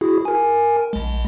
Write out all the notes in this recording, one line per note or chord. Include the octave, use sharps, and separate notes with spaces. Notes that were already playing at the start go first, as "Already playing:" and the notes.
E4 F#4 G#4
A#4 G#5
A#1 G#3